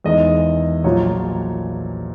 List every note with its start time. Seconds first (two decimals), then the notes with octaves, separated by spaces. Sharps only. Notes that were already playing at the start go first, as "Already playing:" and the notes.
0.04 E2 D#3 G#3 D#5
0.84 A#1 A#2 F#3 C#5